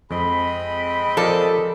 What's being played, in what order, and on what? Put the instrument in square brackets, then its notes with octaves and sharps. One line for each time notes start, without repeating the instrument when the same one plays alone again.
[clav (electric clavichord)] F2 [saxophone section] G#3 C4 D#5 [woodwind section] B5
[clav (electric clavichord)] F3 A#4 D5 [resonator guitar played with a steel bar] A4